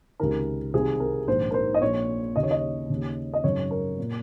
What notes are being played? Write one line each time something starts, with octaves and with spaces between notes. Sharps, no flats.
C#2 C3 D#3 A#4
C2 C3 D#3 G#4
A#4
A#1 G#2 D#3 C5
A#4
C5
D#5
A#1 A#2 C#5
D#2 C#3 D#5
C#5
D#5
D#2 C#3
D#5
G#1 F#2 C#3 C#5
A#4
A#2